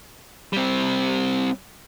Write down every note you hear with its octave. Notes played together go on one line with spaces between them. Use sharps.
G3 C4